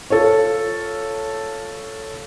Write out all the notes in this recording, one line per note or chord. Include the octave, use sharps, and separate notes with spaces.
F4 A4 C#5